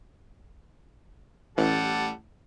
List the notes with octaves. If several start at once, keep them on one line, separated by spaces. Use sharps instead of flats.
A1 G3 A4 F#5